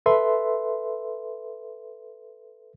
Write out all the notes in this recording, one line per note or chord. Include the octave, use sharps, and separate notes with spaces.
A4 B4 E5 C6